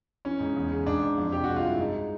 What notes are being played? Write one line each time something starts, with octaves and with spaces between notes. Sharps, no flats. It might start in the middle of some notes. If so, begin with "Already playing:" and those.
E3 C#4
G#2
E2
C#3
G#2 D4
G#2
F2
C3 G4
G#3 F#4
F4
G2 E4
G#3 D#4